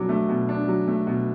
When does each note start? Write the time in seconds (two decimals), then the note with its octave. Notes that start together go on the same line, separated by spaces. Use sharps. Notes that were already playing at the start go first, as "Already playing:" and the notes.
Already playing: B2 F#3 D4 D6
0.09 A3
0.29 B2
0.49 D4
0.68 F#3
0.88 A3
1.07 B2